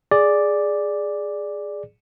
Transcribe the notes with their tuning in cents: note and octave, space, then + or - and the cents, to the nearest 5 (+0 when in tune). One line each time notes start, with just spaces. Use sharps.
G#4 +0 D5 +0